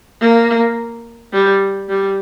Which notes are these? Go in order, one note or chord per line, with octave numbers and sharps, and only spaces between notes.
A#3
G3
G3